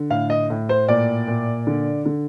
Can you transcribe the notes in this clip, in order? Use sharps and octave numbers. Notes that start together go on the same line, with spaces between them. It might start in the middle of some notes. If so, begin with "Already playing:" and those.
Already playing: D3
A2 F5
D#5
A2
C5
A#2 D5
A#2
D3
D3